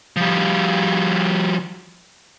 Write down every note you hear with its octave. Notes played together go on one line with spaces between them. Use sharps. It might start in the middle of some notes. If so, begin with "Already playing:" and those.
F3 G3